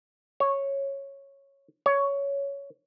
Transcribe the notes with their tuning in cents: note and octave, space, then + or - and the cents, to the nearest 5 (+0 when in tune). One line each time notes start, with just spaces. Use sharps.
C#5 -10
C#5 +10